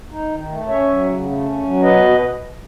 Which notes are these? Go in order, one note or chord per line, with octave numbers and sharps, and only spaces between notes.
D#4
D#3
A3
C#4 C#5 E5
F#3
C#3
A3
C#4
F#3
B2 B4 D#5